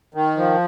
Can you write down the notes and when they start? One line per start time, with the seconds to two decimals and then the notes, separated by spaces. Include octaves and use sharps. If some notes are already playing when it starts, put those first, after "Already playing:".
0.14 D#3
0.37 F3